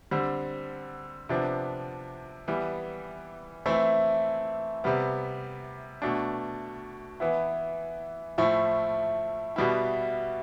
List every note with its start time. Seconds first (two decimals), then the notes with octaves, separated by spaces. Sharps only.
0.11 D3 G3 C4
1.29 C3 F3 B3 D4
2.48 E3 G3 B3
3.66 E3 A3 C4 E4
4.84 C3 G3 B3
6.02 B2 A3 D4
7.20 E3 B3 E4
8.38 A2 F3 A3 E4
9.56 B2 G3 B3 E4